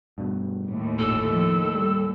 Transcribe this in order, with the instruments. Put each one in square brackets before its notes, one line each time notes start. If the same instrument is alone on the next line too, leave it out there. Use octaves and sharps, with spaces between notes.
[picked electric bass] G2 B2
[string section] D#2 A2
[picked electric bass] G1 A#2 [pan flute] A4
[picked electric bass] F3
G3